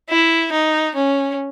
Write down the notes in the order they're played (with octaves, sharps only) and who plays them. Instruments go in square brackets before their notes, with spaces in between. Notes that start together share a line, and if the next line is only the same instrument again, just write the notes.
[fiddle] E4
D#4
C#4